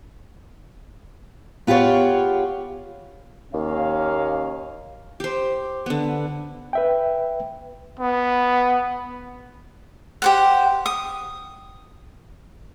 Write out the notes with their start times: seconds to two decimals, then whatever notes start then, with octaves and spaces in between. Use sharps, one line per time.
1.67 B3 F4 G4 G#4 C#5
3.53 D#2 A#3 C#4 F5
5.20 G4 C5
5.86 D3 B3
6.73 B4 E5 G5
8.00 B3
10.22 G4 C5 F#5
10.86 D#6